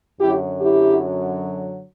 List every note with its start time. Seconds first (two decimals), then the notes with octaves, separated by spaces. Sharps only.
0.20 F#2 D3 F#3 E4 G4
0.60 E4 G4